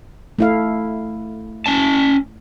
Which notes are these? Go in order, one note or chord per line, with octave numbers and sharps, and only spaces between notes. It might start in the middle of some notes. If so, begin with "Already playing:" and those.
A3 E4 F5
C#4 A5